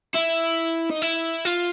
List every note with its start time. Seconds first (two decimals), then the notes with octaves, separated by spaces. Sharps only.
0.15 E4
0.91 D#4
1.02 E4
1.45 F4